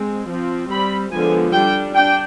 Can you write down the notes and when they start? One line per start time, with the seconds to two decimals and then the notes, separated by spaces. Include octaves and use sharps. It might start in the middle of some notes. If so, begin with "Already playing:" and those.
Already playing: G#3 C4
0.29 F3 C4
0.70 G3 C4 B5
1.12 D3 F3 G#3 B3 G#5
1.53 G3 D4 G5
1.95 D4 G5